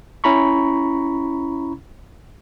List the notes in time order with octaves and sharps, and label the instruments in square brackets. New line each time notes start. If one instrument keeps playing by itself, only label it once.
[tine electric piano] C#4 E4 A#5 B5 C#6